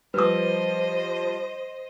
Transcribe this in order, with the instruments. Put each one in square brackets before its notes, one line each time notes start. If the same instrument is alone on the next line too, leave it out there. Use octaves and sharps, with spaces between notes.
[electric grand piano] F3 G3 [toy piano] B4 D#6 [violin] C5 D#5